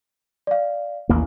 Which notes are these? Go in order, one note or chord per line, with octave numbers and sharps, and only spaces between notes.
D5 F5
A1 D#2 A#3